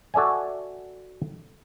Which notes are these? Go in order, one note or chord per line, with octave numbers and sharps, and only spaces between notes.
F#4 A4 D5 E5 G#5